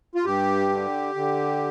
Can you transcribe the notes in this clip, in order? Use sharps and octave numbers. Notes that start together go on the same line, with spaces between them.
F4
G2 G4
D3
D3